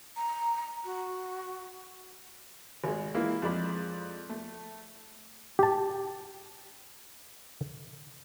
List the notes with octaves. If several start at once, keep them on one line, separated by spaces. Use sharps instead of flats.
A#5
F#4
G#1 G#3
E3 G#3 A#3 E4 F4
F2 G#3 D5 B5
A3
G4 A5